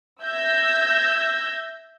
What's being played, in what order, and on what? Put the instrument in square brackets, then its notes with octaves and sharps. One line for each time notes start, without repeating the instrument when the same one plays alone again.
[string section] E5 E6 G6 G#6 A#6